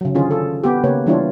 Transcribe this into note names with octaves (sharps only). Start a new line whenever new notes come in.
C#3 F#3
D3 D#3 C#4 F4 G#4
A4
B3 G4
C#3 A#3 B4 C#5
E3 G3 D4 E4 F4 C#5